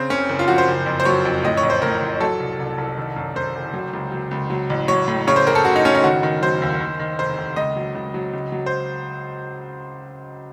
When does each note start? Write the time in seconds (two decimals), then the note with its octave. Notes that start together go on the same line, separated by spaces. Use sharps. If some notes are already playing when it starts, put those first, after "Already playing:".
Already playing: C#3 C4
0.10 F#1 C#4
0.29 F#1
0.39 F4
0.48 F3 F#4
0.58 C5
0.68 F#1
0.86 F2
1.00 C5
1.05 F#3 C#5
1.25 F2
1.44 A2 D#5
1.57 C#5
1.63 A1
1.70 C5
1.82 A2 A#4
2.01 A1
2.21 F#3 A4
2.40 C2
2.59 C2
2.78 C2
2.97 D#3
3.16 F#2
3.35 F#2 C5
3.55 F#1
3.73 F#3
3.93 C#2
4.12 F#3
4.31 C#2
4.50 F#3
4.70 A1
4.88 F#3 C#5
5.08 A2
5.27 C#3 C#5
5.36 C5
5.47 F#1 A#4
5.55 A4
5.65 F#1 F#4
5.76 D#4
5.84 F#1 C#4
5.95 D#4
6.04 D#3 F#4
6.23 D#3
6.42 F#3 C5
6.62 D#2
6.80 D#3
6.99 D#3
7.19 F1 C5
7.38 F1
7.56 C#2 D#5
7.76 F#3
7.95 C#2
8.14 F#3
8.33 C#2
8.52 F#3
8.66 C5